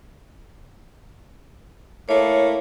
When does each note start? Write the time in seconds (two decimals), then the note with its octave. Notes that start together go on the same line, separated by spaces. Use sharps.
2.09 A3 A#3 E4 C#5